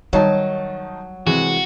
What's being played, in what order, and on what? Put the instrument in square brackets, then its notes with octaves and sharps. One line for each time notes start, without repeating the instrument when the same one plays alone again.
[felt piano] D#3 D#4 A5 [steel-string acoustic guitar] F#3 [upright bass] G3
[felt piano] C3 E3 G#3 [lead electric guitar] F#4